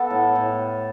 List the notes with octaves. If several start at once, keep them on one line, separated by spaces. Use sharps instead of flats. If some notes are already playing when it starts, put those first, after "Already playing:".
Already playing: B3 A4
A2
A2